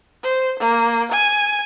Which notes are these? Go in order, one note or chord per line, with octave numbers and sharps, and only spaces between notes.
C5
A#3
G#5